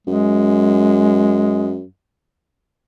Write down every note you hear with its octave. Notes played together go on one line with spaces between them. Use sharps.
F#2 G#3